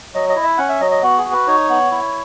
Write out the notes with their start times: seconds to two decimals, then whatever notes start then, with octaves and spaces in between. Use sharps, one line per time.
0.14 F#3 D#5
0.29 D#5
0.36 E4
0.43 E5
0.58 C#4 F#5
0.69 E5
0.80 F#3 D#5
0.91 D#5
1.03 B3 F#4
1.18 G#4
1.25 F#4
1.32 B4
1.47 D#4 C#5
1.69 B3
1.91 E4